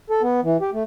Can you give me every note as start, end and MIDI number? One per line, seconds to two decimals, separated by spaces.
0.10 0.22 69
0.22 0.40 59
0.43 0.57 52
0.61 0.70 67
0.73 0.83 57